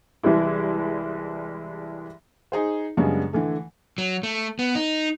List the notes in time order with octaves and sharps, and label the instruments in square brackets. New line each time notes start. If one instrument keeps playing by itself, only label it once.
[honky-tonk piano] C2 E3 G3 G#3 E4
[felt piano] D#4 G#4 C5
F#2 C#3 G3 G#3 B3 D4
D3 E3 A3
[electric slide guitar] F#3
A3
B3
D#4